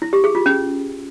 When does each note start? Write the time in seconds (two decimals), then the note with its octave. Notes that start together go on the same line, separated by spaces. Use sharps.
0.02 E4
0.13 G4
0.24 G#4
0.35 F4
0.46 C#4